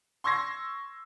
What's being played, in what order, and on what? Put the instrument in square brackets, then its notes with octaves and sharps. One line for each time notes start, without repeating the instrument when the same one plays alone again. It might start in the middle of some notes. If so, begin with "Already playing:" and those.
[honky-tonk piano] C6 C#6 E6 G#6 A#6 C7